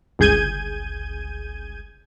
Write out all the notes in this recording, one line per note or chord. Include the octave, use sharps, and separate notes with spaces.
G1 C#2 G#4 G6 G#6 D#7